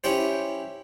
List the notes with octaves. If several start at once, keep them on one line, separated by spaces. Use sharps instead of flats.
C#4 E4 G4 C5